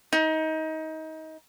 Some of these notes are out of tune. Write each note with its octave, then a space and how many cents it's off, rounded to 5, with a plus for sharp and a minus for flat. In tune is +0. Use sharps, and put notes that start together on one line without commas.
D#4 +25